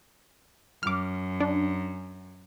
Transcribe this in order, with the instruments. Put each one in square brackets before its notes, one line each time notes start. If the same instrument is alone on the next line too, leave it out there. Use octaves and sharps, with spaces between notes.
[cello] F#2 [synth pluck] D6 F6
[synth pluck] D4